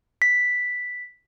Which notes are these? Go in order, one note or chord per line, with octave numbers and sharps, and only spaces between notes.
B6